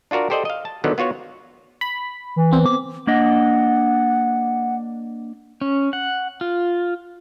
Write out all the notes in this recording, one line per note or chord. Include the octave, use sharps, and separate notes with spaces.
D4 F4 F#4 A#4 D5
G4 A4 C5 D5 D#5
D#5 F5
A5
D3 D#3 F3 F#3 B3
B3 F4 F#4 C#5 F#5
B5
E3
B3 C4
D6
A#3 D4 D#5 F#5
C#4
F#5
F4